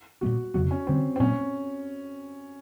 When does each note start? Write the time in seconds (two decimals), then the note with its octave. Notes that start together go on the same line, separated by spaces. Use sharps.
0.21 A#2 G3 B3 D4 F#4
0.54 F2 C#3 F#3 B3 F#4
0.71 C#4
0.87 G2 D3 G3 C4
1.16 C4
1.20 A#2 F#3 A#3 C#4